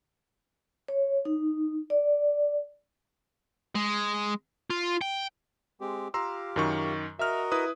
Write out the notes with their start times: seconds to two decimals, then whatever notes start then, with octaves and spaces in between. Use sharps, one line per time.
0.88 C#5
1.25 D#4
1.90 D5
3.75 G#3
4.70 F4
5.01 G5
5.81 G#3 C4 G4
6.14 F4 G4 A#5 C6 E6
6.56 F#2 D#3 C#6
7.19 F#4 A#4 D#5 E5 F6
7.52 E4 B4 D#6